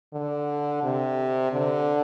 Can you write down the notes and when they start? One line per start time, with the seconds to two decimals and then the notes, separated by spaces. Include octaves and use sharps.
0.13 D3
0.83 C3
1.53 D3